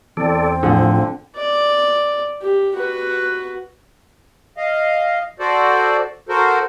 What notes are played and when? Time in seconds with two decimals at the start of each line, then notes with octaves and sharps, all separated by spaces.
0.17 E2 C4 A4 D5
0.63 A2 D3 F3 G#4
1.36 D5
2.42 G4
2.76 F#4 B4
4.57 D#5 F5
5.39 F#4 A4 C5 D5
6.29 F#4 A4 A#4 C5